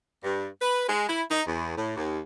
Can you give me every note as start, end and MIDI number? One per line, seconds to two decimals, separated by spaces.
0.23 0.47 43
0.62 0.84 71
0.89 1.06 56
1.09 1.23 64
1.31 1.42 63
1.48 1.76 40
1.77 1.94 45
1.96 2.20 39